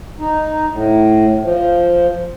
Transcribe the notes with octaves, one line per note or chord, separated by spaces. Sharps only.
D#4
A2
F3